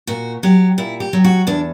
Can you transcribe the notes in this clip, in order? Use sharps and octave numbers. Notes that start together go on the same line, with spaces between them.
A#2 F#4
F#3 G4
A#2 E4
G4
F#3
F#4
E2 D4